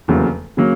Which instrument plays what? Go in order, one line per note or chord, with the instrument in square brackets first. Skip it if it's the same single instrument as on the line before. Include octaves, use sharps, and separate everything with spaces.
[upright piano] F1 E2 C#3 F#3 A#3
C#3 F#3 A#3